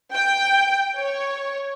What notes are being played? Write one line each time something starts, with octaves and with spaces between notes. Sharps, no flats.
G5
C#5